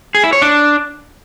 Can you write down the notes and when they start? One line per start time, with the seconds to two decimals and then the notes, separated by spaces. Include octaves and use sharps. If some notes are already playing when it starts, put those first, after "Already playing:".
0.15 G#4
0.24 E4
0.33 C#5
0.42 D4